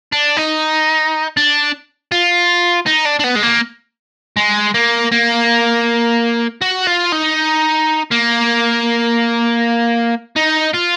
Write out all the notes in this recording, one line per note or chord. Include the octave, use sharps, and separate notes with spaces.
D4
D#4
D4
F4
D#4
D4
D4
B3
G#3
A#3
G#3
A#3
A#3
F#4
F4
D#4
A#3
D#4
F4